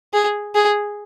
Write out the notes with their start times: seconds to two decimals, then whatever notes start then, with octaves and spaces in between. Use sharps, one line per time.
0.13 G#4
0.55 G#4